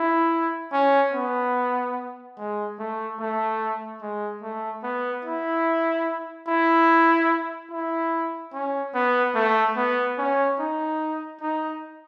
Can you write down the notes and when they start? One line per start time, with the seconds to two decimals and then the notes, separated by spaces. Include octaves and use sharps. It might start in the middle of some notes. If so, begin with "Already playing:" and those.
Already playing: E4
0.73 C#4
1.14 B3
2.38 G#3
2.79 A3
3.20 A3
4.02 G#3
4.42 A3
4.83 B3
5.25 E4
6.47 E4
7.71 E4
8.53 C#4
8.94 B3
9.35 A3
9.76 B3
10.18 C#4
10.59 D#4
11.41 D#4